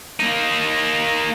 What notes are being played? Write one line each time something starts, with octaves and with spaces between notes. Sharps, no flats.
A#3 D#4